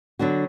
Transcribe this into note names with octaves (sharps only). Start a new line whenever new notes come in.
D3 F#3 B3 D4 F#4